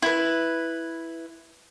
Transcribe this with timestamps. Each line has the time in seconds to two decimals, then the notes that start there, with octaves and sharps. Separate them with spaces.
0.02 E4 B4